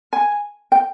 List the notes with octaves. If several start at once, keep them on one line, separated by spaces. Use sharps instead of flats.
G#5
G5